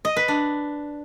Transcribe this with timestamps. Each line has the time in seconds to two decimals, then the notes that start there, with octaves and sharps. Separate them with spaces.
0.05 D#5
0.16 B4
0.28 D4